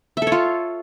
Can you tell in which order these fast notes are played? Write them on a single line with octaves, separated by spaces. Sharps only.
E5 A4 C#5 F4